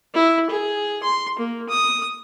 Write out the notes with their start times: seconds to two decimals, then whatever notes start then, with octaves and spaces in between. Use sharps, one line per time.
0.14 E4
0.50 G#4
1.03 C6
1.39 A#3
1.69 D#6